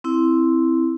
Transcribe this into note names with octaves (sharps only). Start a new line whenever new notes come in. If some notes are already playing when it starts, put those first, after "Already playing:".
C4 E4